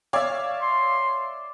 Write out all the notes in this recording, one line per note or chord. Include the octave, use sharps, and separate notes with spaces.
C#5 D5 E5 F5 G#6
C6